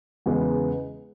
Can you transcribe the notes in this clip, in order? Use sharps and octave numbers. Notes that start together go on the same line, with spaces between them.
E2 C#3 G#3 B3